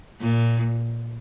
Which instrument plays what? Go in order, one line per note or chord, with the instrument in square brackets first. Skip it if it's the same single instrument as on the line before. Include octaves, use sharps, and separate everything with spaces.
[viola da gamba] A#2